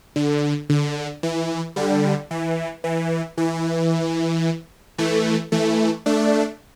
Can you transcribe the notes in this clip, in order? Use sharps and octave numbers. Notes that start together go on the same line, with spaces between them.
D3
D3
E3
D3 G3
E3
E3
E3
E3 A3
E3 A3
A3 D4